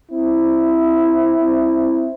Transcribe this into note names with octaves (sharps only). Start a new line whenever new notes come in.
C4 E4